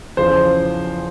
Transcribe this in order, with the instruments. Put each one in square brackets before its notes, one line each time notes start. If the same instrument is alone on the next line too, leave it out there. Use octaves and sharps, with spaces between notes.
[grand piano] E2 C#3 F3 C5